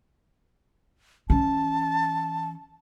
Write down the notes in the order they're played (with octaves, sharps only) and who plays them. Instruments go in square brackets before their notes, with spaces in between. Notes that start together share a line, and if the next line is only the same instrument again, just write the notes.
[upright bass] E3 C#4 [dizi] A5